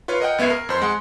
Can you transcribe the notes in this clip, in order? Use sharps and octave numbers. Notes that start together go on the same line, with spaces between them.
F4 B4 C#5 F5
A#4 D#5 F#5 G5
C#2 B3 E5 G#6 C7
A#4
F2 C5 C6
G#3 F#5 C6